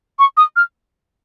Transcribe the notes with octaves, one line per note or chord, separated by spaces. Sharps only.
C#6
D#6
F6